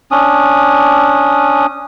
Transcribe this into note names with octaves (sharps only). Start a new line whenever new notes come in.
C#4 D4 D#6